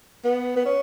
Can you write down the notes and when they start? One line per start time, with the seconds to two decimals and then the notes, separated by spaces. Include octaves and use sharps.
0.24 B3
0.56 B3
0.66 C#4